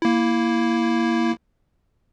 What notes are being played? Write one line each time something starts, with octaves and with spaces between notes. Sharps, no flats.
A#3 E4